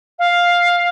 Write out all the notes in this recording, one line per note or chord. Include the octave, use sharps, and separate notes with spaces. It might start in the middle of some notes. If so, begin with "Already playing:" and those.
F5